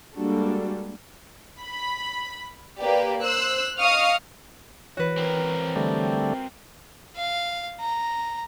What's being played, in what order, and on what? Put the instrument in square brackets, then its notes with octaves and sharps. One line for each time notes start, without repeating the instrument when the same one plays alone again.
[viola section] G3 G#3 A#3 D4 F#4 A4
[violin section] B5
A#3 G4 B4 D5
C5 E6 F#6
D#5 F5 C#6 D#6 F6
[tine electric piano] E3 C#5 [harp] F#4 B4
[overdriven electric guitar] C4 A#4
[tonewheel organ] D3 G3 A3
[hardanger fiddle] F5
A#5